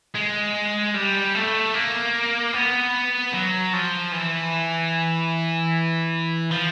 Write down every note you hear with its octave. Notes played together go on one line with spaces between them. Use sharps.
G#3
G3
A3
A#3
B3
F#3
F3
E3
F3